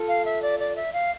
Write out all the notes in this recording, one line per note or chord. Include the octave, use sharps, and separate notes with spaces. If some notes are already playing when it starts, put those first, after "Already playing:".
Already playing: F4 A4
F5
E5
D5
D5
E5
F5